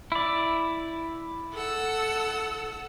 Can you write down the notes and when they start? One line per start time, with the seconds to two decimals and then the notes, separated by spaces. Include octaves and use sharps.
0.12 E4 D5
1.53 A4 F#5 E6